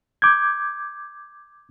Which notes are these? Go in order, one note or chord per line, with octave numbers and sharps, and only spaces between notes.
D6 G6 G#6